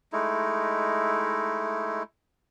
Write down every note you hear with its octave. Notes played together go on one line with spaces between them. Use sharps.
G#3 A3 D#4 E4